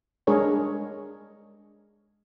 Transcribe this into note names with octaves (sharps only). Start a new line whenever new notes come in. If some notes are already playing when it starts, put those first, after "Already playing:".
G#3 D4 G#4 A#4 C#5